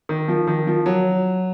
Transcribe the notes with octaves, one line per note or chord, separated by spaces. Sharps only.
D#3
F3
D#3
F3
F#3